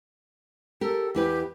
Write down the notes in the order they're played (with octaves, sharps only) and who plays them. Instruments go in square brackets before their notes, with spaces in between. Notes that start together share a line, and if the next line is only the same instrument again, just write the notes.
[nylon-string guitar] G4 A#4 [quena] A4
[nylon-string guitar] E2 E4 B4 [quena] G4